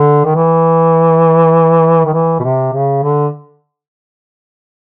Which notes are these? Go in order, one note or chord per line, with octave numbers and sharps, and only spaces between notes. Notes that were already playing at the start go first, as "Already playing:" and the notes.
Already playing: D3
D#3
E3
D#3
E3
B2
C3
C#3
D3